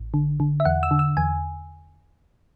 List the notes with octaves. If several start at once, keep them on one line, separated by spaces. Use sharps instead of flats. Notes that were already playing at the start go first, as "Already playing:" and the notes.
Already playing: A1
D3
D3
E5
E2 F#5
E6
D3
E6
E2 G#5